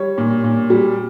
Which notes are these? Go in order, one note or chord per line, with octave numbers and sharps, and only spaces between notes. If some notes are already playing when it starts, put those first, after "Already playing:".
Already playing: G3 C#5
A#2
A#2
G3